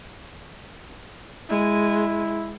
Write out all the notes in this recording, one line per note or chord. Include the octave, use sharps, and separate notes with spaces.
G#3 E4